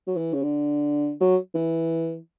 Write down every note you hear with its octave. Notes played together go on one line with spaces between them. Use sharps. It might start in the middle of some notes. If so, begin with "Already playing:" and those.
F#3
E3
C#3
D3
F#3
E3